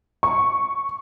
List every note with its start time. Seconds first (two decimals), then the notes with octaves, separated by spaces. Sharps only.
0.23 C#6